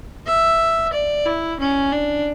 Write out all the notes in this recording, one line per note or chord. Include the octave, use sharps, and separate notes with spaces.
E5
D5
E4
C#4
D4